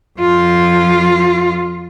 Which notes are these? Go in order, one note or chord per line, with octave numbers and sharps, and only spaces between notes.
F2 F4